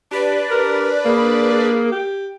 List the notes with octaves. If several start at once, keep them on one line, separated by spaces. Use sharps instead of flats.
D4 G4 B4 D5
G4 A#4
A#3 G#4
G4